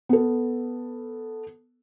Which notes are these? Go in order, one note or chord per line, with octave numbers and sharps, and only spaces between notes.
B3 A4